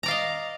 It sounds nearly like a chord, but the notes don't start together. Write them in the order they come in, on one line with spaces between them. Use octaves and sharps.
A#5 D5 F5 D#5